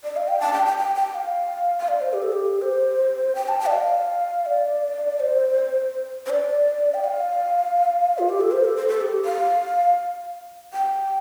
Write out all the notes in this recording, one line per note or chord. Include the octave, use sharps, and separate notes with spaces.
D5
F5
G5
A5
G5
G5
G5
G5
F5
F5
D5
C5
G4
A4
G4
C5
G5
A5
G5
D5
F5
D5
C5
C5
D5
G5
F5
F4
G4
A4
C5
A4
C5
A4
G4
F5
G5